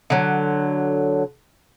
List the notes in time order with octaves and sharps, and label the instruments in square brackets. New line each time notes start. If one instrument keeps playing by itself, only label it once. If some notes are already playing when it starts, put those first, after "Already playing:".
[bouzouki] D3 F#3